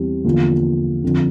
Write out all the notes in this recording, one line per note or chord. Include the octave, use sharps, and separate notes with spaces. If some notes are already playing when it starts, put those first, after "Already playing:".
Already playing: E2 E3 G3 C4
E2 D3 F3 A#3 F4
F2 D3 F3